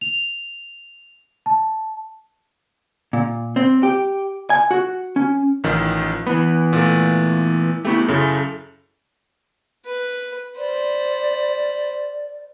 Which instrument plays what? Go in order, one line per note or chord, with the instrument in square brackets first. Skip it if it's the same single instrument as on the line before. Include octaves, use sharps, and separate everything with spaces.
[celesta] F7
A5
[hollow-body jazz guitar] A#2
C4
G4
G#5
F#4
C#4
[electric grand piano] A1 D#3 F3
[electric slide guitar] E3 B3 [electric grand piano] B5
[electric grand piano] A#2 A3
[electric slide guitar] A3 B3 E4 [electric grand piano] G4 C#6
[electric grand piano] F#2 C#3 E4 [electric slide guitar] A4
[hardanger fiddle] B4
[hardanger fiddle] C5 B5 [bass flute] D5